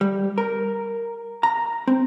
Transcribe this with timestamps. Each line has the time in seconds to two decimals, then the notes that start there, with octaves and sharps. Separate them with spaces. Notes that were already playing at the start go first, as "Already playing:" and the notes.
0.01 G3
0.38 A#4
1.43 A#5
1.87 C4